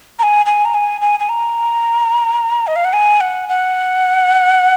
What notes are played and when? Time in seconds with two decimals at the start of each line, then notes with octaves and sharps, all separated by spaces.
0.19 A#5
0.23 G#5
0.46 G#5
0.65 A#5
0.74 G#5
1.01 G#5
1.20 G#5
1.29 A#5
2.67 D#5
2.76 F5
2.85 F#5
2.93 G#5
3.21 F#5
3.49 F#5